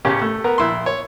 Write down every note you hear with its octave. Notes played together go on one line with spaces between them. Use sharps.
A1 C#3 C#4 G4
A3
B3 A#4 F#5 A#5
A#1 E4 C6
C#5